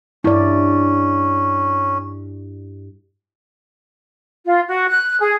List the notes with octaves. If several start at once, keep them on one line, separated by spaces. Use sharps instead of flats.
G2 C#4 E4 D5
F4
F#4
F#6
G#4